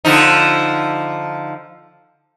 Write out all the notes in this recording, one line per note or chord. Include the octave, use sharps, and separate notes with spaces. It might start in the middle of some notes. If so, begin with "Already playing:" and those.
D3 F3 D#4